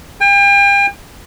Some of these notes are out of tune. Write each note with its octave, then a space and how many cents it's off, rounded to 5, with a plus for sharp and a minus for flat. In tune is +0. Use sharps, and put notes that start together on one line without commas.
G5 +40